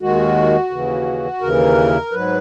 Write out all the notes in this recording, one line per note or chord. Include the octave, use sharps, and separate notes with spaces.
D#2 D#3 G#3 F#4
D#2 C#3 E3
D#2 C#3 E3 A#4
G#2 F#3 B4